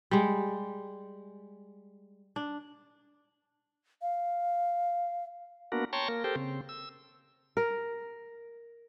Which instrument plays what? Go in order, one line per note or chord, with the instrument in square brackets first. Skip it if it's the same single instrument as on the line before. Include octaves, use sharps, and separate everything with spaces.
[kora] G3 G#3
D4
[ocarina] F5
[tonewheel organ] A#3 B3 D4 F#4 A#4
C#5 G5 A5 A#5 C6 C#6
A#3 A#4
G4 A4 A#4 C5 G5
C#3 C4
E6
[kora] A#4